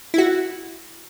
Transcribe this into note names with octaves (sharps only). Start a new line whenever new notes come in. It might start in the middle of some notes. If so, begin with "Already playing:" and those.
E4 F#4